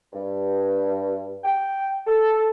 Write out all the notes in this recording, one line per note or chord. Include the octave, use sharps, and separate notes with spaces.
G2
G5
A4